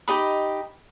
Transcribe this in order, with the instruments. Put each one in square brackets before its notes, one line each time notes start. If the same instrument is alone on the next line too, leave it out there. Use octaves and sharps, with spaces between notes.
[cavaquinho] D#4 G4 D#5 B5